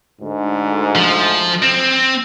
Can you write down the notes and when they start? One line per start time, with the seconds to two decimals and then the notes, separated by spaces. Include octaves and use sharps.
0.22 D2 G#2
0.96 F3
1.62 C4